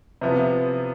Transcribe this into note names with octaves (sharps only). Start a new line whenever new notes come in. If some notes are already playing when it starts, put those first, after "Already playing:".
C3 F3 B3 E4